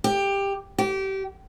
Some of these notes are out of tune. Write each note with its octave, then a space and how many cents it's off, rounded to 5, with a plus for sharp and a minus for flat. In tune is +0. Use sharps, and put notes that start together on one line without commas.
G4 +15
G4 -25